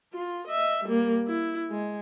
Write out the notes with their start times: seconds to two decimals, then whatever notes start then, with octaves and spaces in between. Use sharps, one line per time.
0.13 F4
0.47 D#5 E5
0.84 G3 A#3
1.27 E4
1.70 G#3